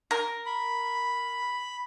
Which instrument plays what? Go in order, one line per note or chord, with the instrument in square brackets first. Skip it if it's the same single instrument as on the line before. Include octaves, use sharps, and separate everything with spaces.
[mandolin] A#4
[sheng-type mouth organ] B5